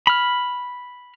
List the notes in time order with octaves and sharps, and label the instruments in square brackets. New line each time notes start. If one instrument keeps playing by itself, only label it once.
[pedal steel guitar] B5 F6